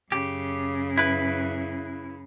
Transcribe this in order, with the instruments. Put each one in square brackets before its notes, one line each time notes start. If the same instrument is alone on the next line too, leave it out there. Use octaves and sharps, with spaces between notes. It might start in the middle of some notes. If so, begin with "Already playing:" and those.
[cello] F#2 C#3 [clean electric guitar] G4
[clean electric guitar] E4 B4